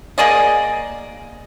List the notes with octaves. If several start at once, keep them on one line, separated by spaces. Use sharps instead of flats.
A#3 G#4 D5 D#5